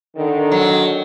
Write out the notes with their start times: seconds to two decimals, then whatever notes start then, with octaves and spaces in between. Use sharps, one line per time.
0.16 D3 D#3
0.52 F#3